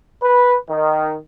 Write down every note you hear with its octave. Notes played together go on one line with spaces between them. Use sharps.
B4
D#3